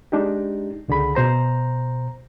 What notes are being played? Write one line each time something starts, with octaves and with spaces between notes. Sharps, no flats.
G#3 D4 D#4 G4
C#2 D3 G#4 B5
B2 C5 A#5